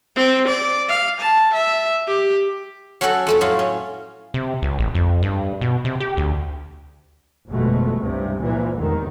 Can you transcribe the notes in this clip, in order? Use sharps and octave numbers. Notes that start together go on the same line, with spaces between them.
C4
D5
F5
A5
E5
G4
F#3 C#4 F#4 A4 F#5
F2 A3 A4
A2 F#3 F4
C#4
C3
C#2
A1
F2
G2
B2
C3
G4
D2
G1 F2 B2 G#3 A3
C#2 G2 C3
A#2 E3 F3
F1 E2 G#2 D#3